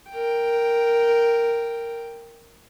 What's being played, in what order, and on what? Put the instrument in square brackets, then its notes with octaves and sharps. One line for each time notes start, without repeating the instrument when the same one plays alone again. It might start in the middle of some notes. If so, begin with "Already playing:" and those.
[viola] A#4 G5